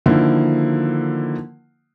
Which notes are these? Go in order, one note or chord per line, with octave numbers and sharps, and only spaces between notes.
D3 D#3 F3 A#3 E4